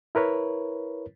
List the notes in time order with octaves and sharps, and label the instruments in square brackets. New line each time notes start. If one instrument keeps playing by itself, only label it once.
[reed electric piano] E4 A#4 B4 C#5